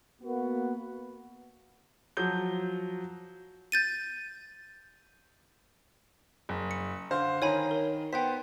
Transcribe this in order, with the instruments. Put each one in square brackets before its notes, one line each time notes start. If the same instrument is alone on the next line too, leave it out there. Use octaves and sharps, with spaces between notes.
[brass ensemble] A#3 B3 F#4
[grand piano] F3 F#3 G6 G7
[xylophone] G6 A6 D#7
[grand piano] F#1
[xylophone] C#7
[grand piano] D3 C5 F5
[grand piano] D#3 A#5 [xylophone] C#5 G#5 B5
[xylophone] A#4 C#5
[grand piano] B3 C5 [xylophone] G5 B6